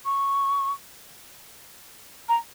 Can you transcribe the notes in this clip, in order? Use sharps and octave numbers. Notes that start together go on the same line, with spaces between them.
C#6
A#5